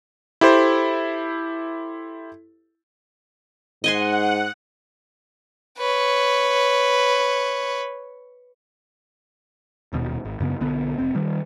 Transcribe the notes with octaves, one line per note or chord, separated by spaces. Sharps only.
E4 G4 A4 C5
G#2 D#5 F#5 G#5 C6
B4 C#5
D#1 D#2 B2
G#1
F#2 C#3 B3
B1 D3 B3
F1 C4
D#3 G3